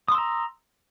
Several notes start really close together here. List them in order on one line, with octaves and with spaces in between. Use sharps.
D#6 C6 E6 A#5